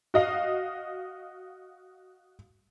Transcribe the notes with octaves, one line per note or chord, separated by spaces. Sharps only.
F#4 D#5 F5